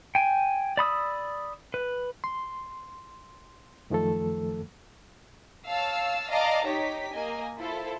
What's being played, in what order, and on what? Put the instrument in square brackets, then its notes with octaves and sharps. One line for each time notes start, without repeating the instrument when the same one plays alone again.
[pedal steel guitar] G5 G#5
D5 B5 D#6 E6
B4
[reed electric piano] C6
F#2 D#3 F3 A3 A4
[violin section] C#5 F5 A5 E6
D5 D#5 F5 A5 A#5 D6
D#4 G4 C#5 B6
A#3 D#5 G#5
E4 F4 A4 C5